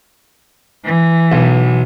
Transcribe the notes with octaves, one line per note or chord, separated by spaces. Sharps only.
E3
B1